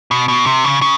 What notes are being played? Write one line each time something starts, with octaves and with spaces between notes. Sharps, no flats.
B2
B2
C3
C#3
C#3